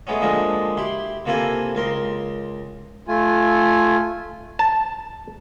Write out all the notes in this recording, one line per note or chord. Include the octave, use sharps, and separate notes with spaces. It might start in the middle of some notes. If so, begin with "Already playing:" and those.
G#3 A3 B3 C#4
D3 F3 G#3 A#3
E4 G4 C6
C3 A#3 E4 F4 A4 G#5
C#2 A#4 C6
A3 F4 G#5
A5